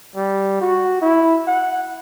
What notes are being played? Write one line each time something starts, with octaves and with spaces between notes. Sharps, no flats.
G3
F#4
E4
F#5